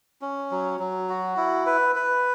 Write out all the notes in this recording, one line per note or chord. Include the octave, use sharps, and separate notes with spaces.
C#4
F#3
F#3
F#4
E4
B4
B4